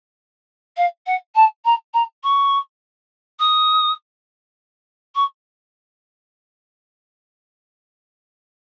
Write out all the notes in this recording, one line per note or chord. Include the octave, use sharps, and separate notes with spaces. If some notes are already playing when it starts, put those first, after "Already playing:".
F5
F#5
A5
A#5
A#5
C#6
D#6
C#6